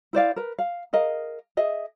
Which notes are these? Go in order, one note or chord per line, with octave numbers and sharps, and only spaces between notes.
E4 C5 D5 F5
A#4 B4
F5
G#4 A#4 D#5 F5
G#4 D#5 E5